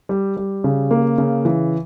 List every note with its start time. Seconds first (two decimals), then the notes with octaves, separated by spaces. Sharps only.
0.09 G3
0.37 G3
0.64 C#3
0.91 A#3
1.18 C#3
1.45 E3